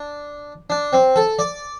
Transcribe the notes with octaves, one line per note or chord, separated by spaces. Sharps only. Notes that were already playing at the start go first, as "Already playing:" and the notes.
Already playing: D4
D4
C4
A4
D5